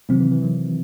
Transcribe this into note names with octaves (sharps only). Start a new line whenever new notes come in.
C3 D#3 E3 F#3 C4
E3
E3
D#3 F#3